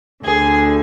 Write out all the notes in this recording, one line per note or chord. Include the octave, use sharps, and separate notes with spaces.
D2 D3 G#4